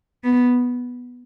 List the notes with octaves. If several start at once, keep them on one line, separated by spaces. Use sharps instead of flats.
B3